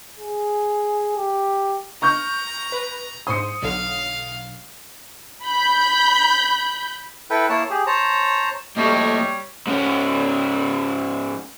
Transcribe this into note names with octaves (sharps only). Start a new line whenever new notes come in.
G#4
G4
A#5 C#6 F6 G6
B4
G#2 C5 C6 D#6 C#7
B1 D3 F#3 F5
B5 G6
E4 A4 B4 G5
A#3 E4 C#5 A5
G4 G#4
C5 C#5 A5 A#5
F2 G3 A3 A#3 F#4 C#5 D#5 E5
G#2 C#4